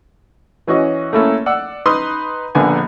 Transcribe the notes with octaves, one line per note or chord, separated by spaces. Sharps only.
E3 C#4 F#4 D#5
A3 A#3 C#4 E4 A4
D5 F#5 E6
D#4 B4 C6 D#6
A#1 D3 A#3 B3 D4 G#5